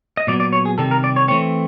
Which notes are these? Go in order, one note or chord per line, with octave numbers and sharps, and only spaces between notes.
D#5
A#2 F#3 B3 D5
D5
C#5
G#4
C3 D#3 G3 A4
A#4
D5
C#5
E3 A3 C4 C#5